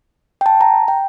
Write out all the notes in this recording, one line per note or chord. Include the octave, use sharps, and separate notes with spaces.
G5
A5
A#5
G5